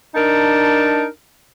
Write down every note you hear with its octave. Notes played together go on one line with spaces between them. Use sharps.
D4 D#4 A#4 A5